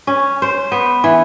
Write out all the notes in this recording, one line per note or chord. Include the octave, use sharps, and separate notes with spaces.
C#4
C5
B3
E3